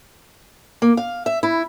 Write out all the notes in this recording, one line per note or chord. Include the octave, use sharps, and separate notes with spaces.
A#3
F5
E5
E4